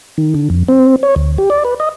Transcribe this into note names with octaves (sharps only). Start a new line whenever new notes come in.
D#3
D3
F2
C4
C#5
D2
G4
D5
B4
D#5